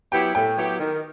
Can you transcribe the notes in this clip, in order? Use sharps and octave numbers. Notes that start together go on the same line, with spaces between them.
F#3 B3 E4 G4 G5
A2 G5
F#3 B3 E4 G4
D#3